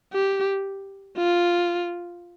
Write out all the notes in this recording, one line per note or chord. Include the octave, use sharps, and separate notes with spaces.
G4
F4